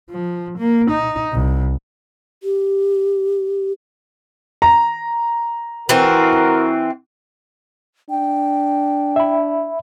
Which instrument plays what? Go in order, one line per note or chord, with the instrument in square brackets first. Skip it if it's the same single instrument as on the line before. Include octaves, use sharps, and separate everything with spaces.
[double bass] F3
A#3
D#4
C2
[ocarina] G4
[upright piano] A#5
[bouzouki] E3 C4 [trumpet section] F#4 A#4
[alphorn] D4 [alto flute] G5
[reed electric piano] E5 B5